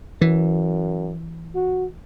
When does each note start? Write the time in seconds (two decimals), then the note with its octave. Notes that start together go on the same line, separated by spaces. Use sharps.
0.21 F#2 E3
1.55 F#4